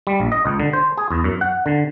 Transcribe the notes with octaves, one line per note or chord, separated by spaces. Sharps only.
G3
A#1
D#5
C#2
D3
C5
G#4
E2
F#2
F#5
D3